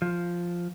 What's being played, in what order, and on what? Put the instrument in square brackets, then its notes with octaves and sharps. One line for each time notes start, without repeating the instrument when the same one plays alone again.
[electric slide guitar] F3